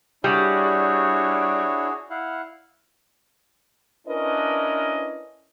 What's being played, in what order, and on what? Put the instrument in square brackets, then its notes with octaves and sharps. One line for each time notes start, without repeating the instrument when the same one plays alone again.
[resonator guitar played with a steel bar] G3 [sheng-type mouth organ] D4 E4 C#5 [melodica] F#4 G#4
[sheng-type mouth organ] E4 F5 F#5
[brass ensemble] C#4 D4 E4 A#4 B4 D#5